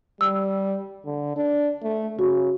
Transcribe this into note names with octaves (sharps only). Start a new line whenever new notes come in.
G3 E6
D3
D4
A3
C#3 F#4